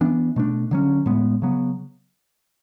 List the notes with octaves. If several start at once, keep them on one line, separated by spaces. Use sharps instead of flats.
E3 B3 D4
B2 A3 D4
D3 F#3 C#4
A2 G#3 B3
C#3 F#3 B3